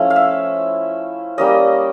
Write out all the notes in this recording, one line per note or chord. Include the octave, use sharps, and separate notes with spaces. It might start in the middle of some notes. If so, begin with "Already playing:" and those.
Already playing: F3 A3 C#4 E4
F5
E5
G3 A#3 C#4 D#5